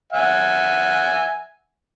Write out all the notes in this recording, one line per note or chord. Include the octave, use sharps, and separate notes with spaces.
E5 F#5 G#5